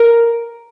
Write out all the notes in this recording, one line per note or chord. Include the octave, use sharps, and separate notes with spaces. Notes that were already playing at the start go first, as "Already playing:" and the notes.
Already playing: A#4